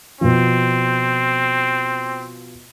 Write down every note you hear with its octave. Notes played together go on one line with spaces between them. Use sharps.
B2 F3 C4